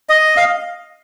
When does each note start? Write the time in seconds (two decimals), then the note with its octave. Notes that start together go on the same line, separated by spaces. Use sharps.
0.09 D#5
0.37 F5